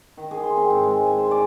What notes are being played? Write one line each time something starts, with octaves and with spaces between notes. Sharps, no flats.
D#3
G#4
C6
C4
G#2
G#3
G#5
C5
D5